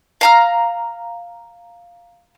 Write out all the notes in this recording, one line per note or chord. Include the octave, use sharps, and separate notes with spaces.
F5 A#5 F6